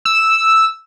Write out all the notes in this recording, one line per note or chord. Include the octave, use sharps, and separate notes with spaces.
E6